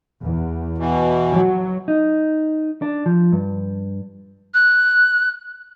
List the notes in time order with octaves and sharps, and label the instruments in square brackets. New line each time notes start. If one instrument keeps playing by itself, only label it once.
[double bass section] E2
[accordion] B2 E3
[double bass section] F#3
[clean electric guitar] D#4
D4
F3
G2
[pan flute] F#6